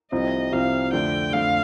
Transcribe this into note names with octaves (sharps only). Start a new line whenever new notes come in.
C2 C3 F3 C4 D#5
C2 C3 F3 C4 F5
F2 D3 A3 G5
F2 D3 A3 F5